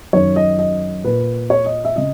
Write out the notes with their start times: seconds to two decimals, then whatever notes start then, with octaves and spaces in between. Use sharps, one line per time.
0.13 F#2 D#3 C#5
0.36 D#5
0.59 D#5
1.05 A#2 B4
1.50 C#5
1.66 D#5
1.85 E5
1.96 C#3 D#5